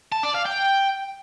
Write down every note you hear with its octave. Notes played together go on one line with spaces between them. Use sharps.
A5
D5
F5
G5